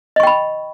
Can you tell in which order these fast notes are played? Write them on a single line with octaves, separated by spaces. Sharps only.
D#5 C#6 G5 B5